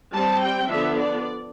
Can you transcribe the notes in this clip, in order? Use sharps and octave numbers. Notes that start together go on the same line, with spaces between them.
G3 C4 A5
G5
D3 F3 B3 D4 E5
D5